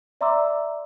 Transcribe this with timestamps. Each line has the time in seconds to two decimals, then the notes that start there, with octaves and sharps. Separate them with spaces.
0.21 D5 E5 A#5 C6 D6 E6